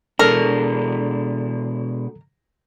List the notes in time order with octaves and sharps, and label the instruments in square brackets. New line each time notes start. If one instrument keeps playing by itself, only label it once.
[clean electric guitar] B2 G#3 D4 [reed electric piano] A4 [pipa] A#4